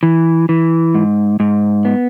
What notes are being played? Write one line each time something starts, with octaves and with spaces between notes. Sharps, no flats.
E3
E3
G#2
G#2
B3